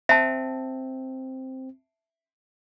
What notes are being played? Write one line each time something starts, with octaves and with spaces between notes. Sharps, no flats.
C4 E5 A5